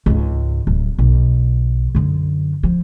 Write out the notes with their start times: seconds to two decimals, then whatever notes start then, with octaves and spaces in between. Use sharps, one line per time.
0.06 C#2 G#2
0.67 D1
0.98 B1
1.95 F#2 D3
2.63 F3